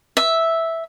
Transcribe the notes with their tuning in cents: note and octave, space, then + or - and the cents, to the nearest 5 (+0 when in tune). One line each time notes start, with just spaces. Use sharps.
E5 -5